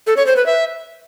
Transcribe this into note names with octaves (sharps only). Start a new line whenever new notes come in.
A4
C#5
C5
B4
E5